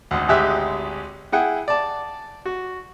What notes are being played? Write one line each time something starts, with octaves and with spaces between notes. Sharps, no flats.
G#1 D2
G#1 D2 G#3 G4 E5 F#6
E4 G#4 F#5 G5
D5 A5
F#4